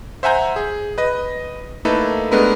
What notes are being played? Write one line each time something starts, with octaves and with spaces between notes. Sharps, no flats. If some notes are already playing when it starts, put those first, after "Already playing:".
C5 E5 F#5 G#5 A#5 G6
G#4
B4 D#5
A3 A#3 D#4 E4 A4 B4
G#3 A3 B3 D4 A#4 B4